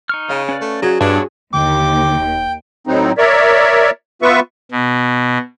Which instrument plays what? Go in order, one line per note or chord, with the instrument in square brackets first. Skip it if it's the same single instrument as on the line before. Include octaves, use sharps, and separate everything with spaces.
[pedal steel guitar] D#4 C#6 F6
[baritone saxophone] C#3 [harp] F5
[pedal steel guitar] C#4 B4 D5
[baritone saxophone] A3
[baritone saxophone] F#3 [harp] F#4 G#4
[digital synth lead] G2 [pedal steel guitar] B3 E4 C#5 [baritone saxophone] D4
[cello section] D#2 [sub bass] D3 [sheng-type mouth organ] G5 [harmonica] D6
[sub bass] D1
[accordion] A2 F#3 C4 D#4
A#4 C#5 D5 E5
B3 F4 B4 E5 C#6
[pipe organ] B2